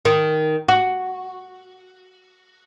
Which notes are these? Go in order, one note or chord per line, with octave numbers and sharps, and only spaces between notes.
D#3
F#4